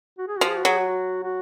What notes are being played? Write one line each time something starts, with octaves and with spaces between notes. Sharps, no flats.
F#4
G#4
F3 F#4
G#4
F#4
F#3 G#4
F#4
F#4
F#4